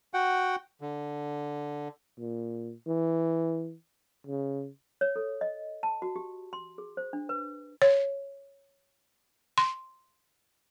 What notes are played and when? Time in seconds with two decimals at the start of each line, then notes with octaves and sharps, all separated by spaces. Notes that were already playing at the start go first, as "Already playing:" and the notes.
0.14 F#4 F#5 G5
0.81 D3
2.19 A#2
2.87 E3
4.27 C#3
5.01 C#5
5.16 A4
5.41 D#5
5.83 A5
6.02 F#4
6.16 G4
6.53 C6
6.78 G#4
6.97 C5
7.13 D4
7.29 B4
7.82 C#5
9.58 C6